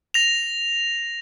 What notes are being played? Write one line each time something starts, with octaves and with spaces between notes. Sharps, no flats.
A#6 F7